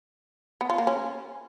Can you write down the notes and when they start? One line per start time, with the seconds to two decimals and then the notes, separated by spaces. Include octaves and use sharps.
0.61 B3
0.70 F4
0.78 A#3
0.87 C#4